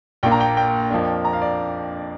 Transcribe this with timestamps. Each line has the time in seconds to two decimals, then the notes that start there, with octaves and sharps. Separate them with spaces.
0.23 A#1 A#2 A#3 D4 G5
0.32 A#5
0.40 G5
0.57 G5
0.91 F2 F3 A#3 D4
1.25 A#5
1.33 F5
1.42 D5